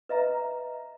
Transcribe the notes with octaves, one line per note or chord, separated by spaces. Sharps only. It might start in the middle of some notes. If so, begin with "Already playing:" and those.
B4 D#5 E5 A#5